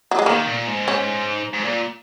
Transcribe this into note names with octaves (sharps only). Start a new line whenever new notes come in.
F#3
G#3
D#3 A#3
A#2
G#2
C#4
G#2
A#2